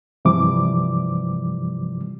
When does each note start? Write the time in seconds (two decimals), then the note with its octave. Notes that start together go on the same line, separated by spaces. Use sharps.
0.25 G2 C3 E3 F3 G3 D6